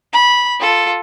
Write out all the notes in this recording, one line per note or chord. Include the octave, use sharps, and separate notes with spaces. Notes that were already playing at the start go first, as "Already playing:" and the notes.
B5
F4 A4